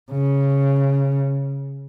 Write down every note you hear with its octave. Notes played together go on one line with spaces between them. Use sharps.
C#3